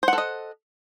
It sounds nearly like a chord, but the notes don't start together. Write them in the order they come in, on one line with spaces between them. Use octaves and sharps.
C5 F#5 A4 D#5